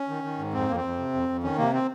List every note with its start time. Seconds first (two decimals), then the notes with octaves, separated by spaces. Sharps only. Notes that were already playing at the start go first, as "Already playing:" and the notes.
Already playing: C#4
0.09 D#3
0.24 D#3
0.38 G#2
0.53 F2 C4
0.69 F2 A#3
0.76 C4
0.84 F2
0.99 C3
1.14 F2
1.29 F2
1.43 D#3 C#4
1.58 C3 A#3
1.73 C4